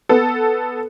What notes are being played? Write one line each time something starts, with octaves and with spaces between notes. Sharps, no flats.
B3 A4